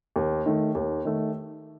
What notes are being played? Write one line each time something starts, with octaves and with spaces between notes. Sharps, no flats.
D#2
D#3 A3
D#2
D#3 A3